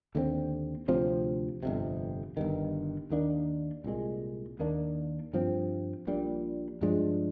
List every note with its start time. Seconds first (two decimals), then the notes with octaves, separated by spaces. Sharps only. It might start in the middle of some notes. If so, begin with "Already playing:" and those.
0.15 D#2 D3 G#3 C4
0.88 D2 C3 F3 C4
1.63 G1 F2 C3
2.37 G1 G2 D#3
3.10 D#2 D#3 A#3 D4
3.84 C2 A#2 G#3
4.59 D#2 D#3 A#3 D4
5.33 G2 F3 C4
6.07 A#1 A#2 G3 D4
6.81 G2 F3 G#3 D4